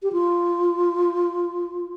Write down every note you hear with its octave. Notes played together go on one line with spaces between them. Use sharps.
G4
F4